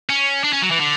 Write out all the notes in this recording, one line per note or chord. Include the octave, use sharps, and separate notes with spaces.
C#4
D4
C#4
F#3
E3
D3